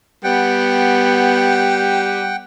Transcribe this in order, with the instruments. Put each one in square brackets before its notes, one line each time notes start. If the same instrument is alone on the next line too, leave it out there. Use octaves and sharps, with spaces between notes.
[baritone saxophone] G3 [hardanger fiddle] B3 [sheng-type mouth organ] F#5 G5